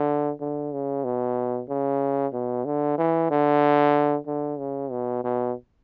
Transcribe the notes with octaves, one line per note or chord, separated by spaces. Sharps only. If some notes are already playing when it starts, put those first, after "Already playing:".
Already playing: D3
D3
C#3
B2
C#3
B2
D3
E3
D3
D3
C#3
B2
B2